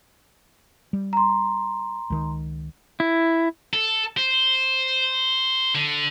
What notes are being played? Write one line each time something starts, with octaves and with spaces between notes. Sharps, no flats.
G3
A#5 C6
C#2 D#3
E4
A4
C5
D3